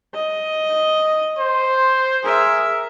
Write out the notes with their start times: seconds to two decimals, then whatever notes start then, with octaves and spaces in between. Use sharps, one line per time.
0.14 D#5
1.38 C5
2.24 G#4 A#4 E5